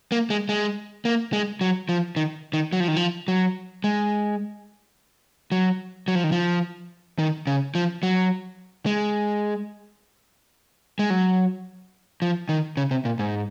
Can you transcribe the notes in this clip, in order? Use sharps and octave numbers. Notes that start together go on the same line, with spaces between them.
A#3
G#3
G#3
A#3
G#3
F#3
F3
D#3
D#3
F#3
F3
D#3
F3
F#3
G#3
F#3
F#3
F3
D#3
F3
D#3
C#3
F3
F#3
G#3
G#3
F#3
F3
D#3
C#3
C3
A#2
G#2